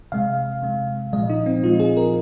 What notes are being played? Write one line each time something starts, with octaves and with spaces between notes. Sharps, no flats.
C3 G#3 F5
C3 G#3
A#2 F3 G#3 D#5
D#4
C4
A#2 F3 G#3 F4
G#4
A#4